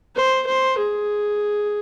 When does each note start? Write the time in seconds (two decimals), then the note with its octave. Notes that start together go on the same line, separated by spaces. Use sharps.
0.16 C5
0.47 C5
0.78 G#4